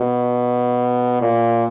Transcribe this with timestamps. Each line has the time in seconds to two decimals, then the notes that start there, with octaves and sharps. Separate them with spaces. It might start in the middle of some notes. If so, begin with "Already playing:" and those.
Already playing: B2
1.22 A#2